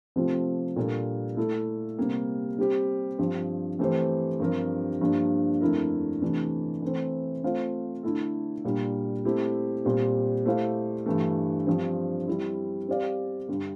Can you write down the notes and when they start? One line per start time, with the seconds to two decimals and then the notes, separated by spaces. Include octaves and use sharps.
0.16 C3 F3 A3 C4 F4
0.76 A#2 G3 A#3 D4 A4
1.37 A3 E4 A4
1.99 C3 G3 A#3
2.58 G3 C4 G4
3.18 G2 F3 C4
3.79 E3 A3 C4 G4 C5
4.40 G2 F3 C4 G4 A#4
5.01 G2 F3 A#3 D4
5.61 F2 D3 A3 E4 A#4
6.22 C3 E3 A3 D4
6.82 E3 A3 C4
7.44 A3 C4 F4 C5 F5
8.03 D3 A3 E4 A4
8.64 A#2 G3 A#3 D4
9.25 A3 C4 E4 G4
9.85 A#2 G3 C4 G4
10.46 A3 E4 G4 C5 F5
11.06 G2 E3 A3
11.67 G2 F3 C4
12.28 G3 C4 E4
12.88 G3 C4 G4 D5 F5
13.48 G2 D3 G3